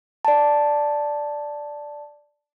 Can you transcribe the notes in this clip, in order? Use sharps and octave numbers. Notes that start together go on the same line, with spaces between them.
D5 A5